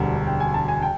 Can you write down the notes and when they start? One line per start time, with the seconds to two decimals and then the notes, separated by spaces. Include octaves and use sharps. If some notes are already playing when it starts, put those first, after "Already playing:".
Already playing: E1 D2 D3 G3
0.27 G5
0.40 G#5
0.54 A5
0.68 G#5
0.82 G5